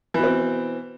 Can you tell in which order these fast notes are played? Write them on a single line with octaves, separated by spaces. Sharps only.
E3 B2 C4